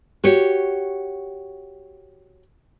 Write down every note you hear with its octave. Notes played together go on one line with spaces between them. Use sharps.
F#4 G4 C#5